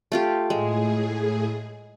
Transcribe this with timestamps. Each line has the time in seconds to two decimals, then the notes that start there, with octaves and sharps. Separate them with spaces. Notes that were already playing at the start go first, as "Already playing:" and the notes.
0.12 A3 F4 G4
0.50 A2 G#3 G#4